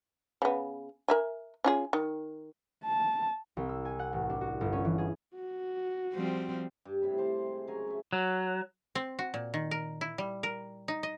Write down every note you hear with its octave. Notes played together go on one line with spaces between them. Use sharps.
C#3 B3
A#4 E5 G#5
C#4 F4 G#4
D#3
A5
C2
E6
G#5
F#5
A1
D4
F#4
G1
C#4
E3
G#4
F#4
F3 G3 C4
G2
A2 C3 B5
G3 C5 A5 C6
G#3
C#3 F#3 A#4 G#5
A3 G#4 E5
F#3
C4
F#4
A#2
D#3
A#4
E4
G3
A#4
D#4
D#5